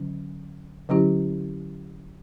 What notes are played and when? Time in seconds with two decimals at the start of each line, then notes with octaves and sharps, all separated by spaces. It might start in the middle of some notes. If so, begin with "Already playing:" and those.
Already playing: D3 F#3 C#4
0.89 D3 F#3 C#4 E4 G4